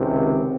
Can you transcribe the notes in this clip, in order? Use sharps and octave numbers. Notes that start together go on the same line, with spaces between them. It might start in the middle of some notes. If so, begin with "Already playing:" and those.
Already playing: C#2 C3 D#3
C4